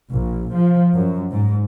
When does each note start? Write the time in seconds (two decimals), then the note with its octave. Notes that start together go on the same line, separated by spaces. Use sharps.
0.10 A#1
0.54 F3
0.94 F#2
1.31 G#2